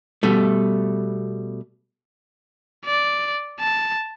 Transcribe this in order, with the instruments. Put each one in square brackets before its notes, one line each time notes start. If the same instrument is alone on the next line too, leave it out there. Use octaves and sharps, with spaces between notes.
[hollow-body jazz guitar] B2 G3 A3
[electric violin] D5
A5